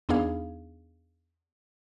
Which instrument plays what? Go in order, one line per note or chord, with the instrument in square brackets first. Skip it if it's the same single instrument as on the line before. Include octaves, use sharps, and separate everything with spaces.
[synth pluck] E2 B3 D4 D#4 G#4 F5